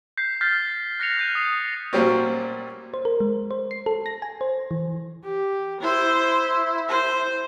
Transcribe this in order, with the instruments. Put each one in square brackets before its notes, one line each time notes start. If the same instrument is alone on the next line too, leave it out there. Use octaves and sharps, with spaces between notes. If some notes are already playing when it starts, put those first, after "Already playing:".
[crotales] G6 B6 C7
F6 G6 A6 B6 C7
F#6 A#6 C#7 F7
F6 G6 D#7
D#6 C7
[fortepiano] A#2 F#3 G3 C4 C#4
[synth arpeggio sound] C5
A#4
G#3
C5
C7
A4
A#6
G#5
C5
E3
[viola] G4
[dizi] E4 [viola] C5
[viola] C5